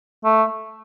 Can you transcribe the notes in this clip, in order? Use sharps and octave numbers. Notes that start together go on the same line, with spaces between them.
A3